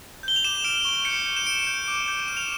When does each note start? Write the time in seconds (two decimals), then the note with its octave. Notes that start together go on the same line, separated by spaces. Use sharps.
0.23 G6 G7
0.36 F7
0.44 D6 E7
0.64 F6 D7
0.85 C#6
1.05 G6 C#7
1.26 G6
1.36 E7
1.47 G6 D7
1.67 G6
1.88 D6
2.08 G6
2.28 F6 E7
2.37 F7